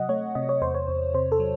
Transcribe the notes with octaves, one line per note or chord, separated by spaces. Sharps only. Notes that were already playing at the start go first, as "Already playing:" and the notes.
Already playing: C3 F#3 D#5 F#5
A3 C#5
C3 D#5
C#5
E2 C5
C#5
E2
C3 C5
A4
F#3